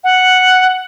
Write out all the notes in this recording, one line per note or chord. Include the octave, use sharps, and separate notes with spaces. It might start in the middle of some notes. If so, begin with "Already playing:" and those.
F#5